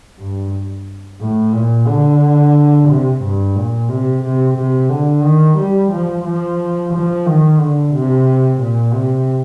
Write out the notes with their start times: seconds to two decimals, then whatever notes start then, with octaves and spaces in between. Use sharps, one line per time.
0.20 G2
1.21 A2
1.54 A#2
1.87 D3
2.88 C3
3.23 G2
3.56 A#2
3.89 C3
4.24 C3
4.57 C3
4.90 D3
5.24 D#3
5.58 G3
5.92 F3
6.25 F3
6.93 F3
7.27 D#3
7.60 D3
7.94 C3
8.61 A#2
8.94 C3